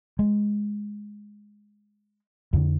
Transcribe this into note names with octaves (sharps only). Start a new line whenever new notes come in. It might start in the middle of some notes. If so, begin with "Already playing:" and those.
G#3
F2 D3